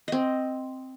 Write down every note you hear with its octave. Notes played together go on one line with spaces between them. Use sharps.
C4 D#5